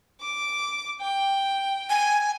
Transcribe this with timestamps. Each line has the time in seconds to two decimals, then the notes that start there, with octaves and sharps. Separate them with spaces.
0.21 D6
1.01 G5
1.90 G#5